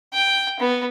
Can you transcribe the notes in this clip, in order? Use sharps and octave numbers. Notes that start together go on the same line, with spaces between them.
G5
B3